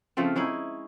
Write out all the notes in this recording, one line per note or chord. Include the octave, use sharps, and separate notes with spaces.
C#3 F3 A3 C4
G#3 C#4 D#4 E4